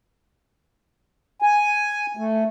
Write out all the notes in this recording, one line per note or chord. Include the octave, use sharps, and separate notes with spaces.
G#5
A3